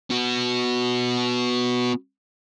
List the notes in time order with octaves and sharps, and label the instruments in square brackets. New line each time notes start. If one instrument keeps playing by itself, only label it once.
[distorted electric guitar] B3 F#4